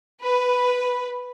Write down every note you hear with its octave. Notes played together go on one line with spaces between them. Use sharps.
B4